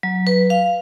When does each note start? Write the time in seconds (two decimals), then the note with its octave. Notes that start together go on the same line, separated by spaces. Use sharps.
0.03 F#3
0.27 B4
0.50 F5